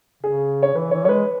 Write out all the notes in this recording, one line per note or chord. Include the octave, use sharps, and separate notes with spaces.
C#3 G#4
C#5
E3 B4
E3 C#5
C#5
G#3 B4